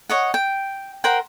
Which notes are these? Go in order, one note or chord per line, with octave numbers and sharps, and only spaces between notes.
C#5 D#5 F#5
G5
A#4 C5 F#5 G5